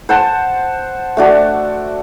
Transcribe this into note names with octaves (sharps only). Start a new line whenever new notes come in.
C5 F#5 A5
A3 D4 F#4